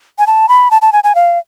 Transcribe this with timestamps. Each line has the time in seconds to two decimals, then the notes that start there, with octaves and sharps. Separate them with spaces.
0.19 G#5
0.27 A5
0.49 B5
0.71 A5
0.82 A5
0.93 G#5
1.04 G#5
1.15 F5